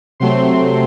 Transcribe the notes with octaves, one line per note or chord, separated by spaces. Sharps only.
C3 F#3 A3 C4 C6